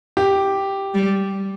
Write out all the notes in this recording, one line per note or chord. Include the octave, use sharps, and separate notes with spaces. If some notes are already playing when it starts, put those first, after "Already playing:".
G4
G3